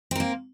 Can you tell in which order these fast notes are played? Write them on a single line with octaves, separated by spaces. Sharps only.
C4 A#4 A#3